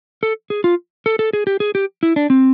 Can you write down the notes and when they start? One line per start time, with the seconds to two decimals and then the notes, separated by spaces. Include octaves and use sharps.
0.23 A4
0.50 G#4
0.64 F4
1.06 A4
1.19 A4
1.33 G#4
1.47 G4
1.60 G#4
1.75 G4
2.03 E4
2.16 D4
2.30 C4